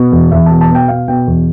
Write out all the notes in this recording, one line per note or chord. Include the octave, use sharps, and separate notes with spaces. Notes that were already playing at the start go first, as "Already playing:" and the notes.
Already playing: B2
E2
E2 E5
B2 A5
A5
B2 G5
B2 F5
B2 G5
E2